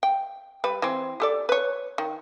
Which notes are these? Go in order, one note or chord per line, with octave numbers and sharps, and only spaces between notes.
G5
G3 B4
E3 C4
G4 A4 D5
B4 C#5
D#3